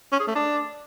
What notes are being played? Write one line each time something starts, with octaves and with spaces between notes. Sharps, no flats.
C#4
G#4
A3
D4